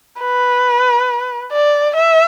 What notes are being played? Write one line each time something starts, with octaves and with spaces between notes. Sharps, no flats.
B4
D5
E5